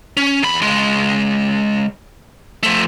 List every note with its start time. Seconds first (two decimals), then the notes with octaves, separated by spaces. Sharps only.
0.17 C#4
0.42 E2 B5
0.62 C#2 G#3
2.63 F3 A3